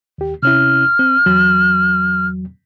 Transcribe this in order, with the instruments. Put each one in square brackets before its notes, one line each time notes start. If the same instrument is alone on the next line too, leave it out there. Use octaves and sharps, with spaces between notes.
[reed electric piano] D#2 G4
[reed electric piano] C3 C#4 E4 [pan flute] F6
[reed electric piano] C4
E2 F#3